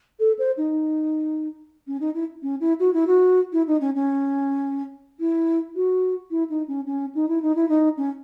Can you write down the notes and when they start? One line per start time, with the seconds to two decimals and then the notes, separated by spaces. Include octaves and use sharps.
0.20 A4
0.39 C5
0.57 D#4
1.87 C#4
2.00 D#4
2.14 E4
2.43 C#4
2.60 E4
2.80 F#4
2.93 E4
3.07 F#4
3.53 E4
3.67 D#4
3.80 C#4
3.95 C#4
5.20 E4
5.75 F#4
6.31 E4
6.50 D#4
6.68 C#4
6.86 C#4
7.15 D#4
7.28 E4
7.42 D#4
7.55 E4
7.69 D#4
7.97 C#4